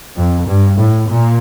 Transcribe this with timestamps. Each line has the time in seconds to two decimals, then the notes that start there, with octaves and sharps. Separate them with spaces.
0.16 F2
0.47 G2
0.77 A2
1.09 A#2